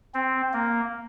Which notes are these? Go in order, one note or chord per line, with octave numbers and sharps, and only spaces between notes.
C4
A#3